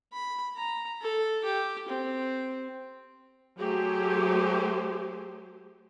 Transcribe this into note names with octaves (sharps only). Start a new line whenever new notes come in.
B5
A#5
A4
G4
C4
F#3 A3 G4 G#4 C5